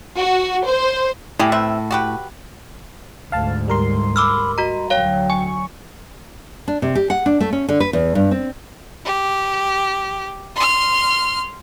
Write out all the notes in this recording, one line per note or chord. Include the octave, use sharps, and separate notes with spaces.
F#4
C5
A2 E4 G4 G#4
C4 B4 E5
F#4 G4 B4
D2 G#2 F5 A5
G3 A#4 C6
B5 D6 E6 F6
F#4 D#5 A#5
D2 F#3 C#5 F5 G5
G#5 C#6
D4
C3
G4
F#5
D4
A3
C#4
D3
B4
E2
G2
C4
G4
C6 F6